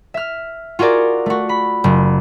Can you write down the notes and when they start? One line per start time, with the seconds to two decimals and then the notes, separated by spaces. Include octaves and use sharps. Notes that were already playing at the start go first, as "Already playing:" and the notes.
0.14 E5 F6
0.79 F4 F#4 G#4 A#4 D5
1.26 A3 F#4
1.49 B5
1.84 F#1